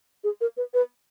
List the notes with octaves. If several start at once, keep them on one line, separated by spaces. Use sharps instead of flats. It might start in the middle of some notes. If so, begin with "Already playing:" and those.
G#4
A#4
B4
B4